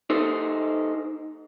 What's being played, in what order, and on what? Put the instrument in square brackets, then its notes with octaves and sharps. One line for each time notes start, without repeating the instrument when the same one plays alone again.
[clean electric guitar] D#4 A4 C5